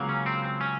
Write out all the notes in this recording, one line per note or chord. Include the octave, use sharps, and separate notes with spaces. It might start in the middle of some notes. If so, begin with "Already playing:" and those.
Already playing: C#2 C#3 F#3 A#3
C#4
C4
C4
C#4